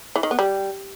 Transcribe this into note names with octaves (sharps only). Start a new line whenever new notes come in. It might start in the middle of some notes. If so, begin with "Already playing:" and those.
E3
D#3
B3
G3